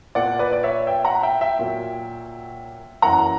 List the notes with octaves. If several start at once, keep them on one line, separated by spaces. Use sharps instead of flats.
A#2 A#3 D5 F#5
B4 D5
D5
C#5 E5
E5 G5
F#5 A#5
E5 G5
E5 G5
A#2 F#3 A#3
F#2 E3 A#3 F#5 A#5